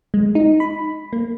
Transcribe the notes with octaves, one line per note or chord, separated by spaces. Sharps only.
G#3
D#4
B5
A#3